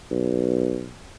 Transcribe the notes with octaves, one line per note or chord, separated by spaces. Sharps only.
B1